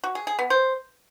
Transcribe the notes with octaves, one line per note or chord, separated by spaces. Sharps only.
F#4
G#4
G#4
B3
C5